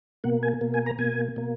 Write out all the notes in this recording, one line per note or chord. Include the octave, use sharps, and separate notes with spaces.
B2 A#3 F#5
G#5
B2 A#3
G#5
A#5
B2 A#3 G#5
B2 A#3